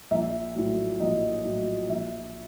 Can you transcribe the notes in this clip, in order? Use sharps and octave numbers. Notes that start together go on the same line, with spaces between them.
A#1 E5
A2 F#3
A#1 D#5
A2 F#3
A#1 E5